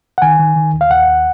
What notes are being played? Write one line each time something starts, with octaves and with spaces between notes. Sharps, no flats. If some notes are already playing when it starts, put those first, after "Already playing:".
F#5
D#3 G#5
D#3
D#3
D#2
F5
D#2 F#5
D#2